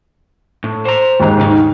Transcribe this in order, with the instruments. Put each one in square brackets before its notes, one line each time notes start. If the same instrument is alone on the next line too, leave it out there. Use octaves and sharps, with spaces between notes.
[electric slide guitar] A2
C5 A#5
[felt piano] D#2 G#2
[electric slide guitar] C#3 D#4